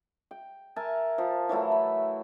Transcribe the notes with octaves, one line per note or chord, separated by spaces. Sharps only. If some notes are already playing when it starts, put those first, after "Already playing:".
G5
A#4 E5 G#5 A5
F3
E3 F#3 A3 E4
B5